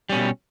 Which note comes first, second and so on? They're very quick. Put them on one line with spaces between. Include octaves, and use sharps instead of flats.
G3 C#4 B2